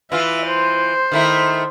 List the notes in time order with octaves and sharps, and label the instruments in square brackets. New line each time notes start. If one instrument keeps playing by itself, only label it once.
[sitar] E3 F4 [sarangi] E5
[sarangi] C5
[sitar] D#3 A3 E4